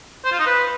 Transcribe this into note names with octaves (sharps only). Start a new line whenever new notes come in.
C5
F4
D#4
B4